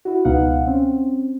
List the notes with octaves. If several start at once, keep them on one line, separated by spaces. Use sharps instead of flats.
E4 F#4
C#2 B2 B3 D#4 F5 F#5
C4 C#4